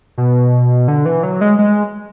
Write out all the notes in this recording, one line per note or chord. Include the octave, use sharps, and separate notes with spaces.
B2
D3
E3
F#3
G#3
G#3